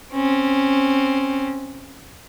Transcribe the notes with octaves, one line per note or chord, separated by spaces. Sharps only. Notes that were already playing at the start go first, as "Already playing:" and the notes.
C4 C#4